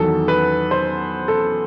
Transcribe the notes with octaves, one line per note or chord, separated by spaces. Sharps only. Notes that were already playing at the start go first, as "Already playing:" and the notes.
Already playing: E2 D#3 F#3 A4
B4
C5
A4